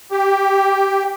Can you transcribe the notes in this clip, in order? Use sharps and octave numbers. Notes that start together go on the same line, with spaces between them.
G4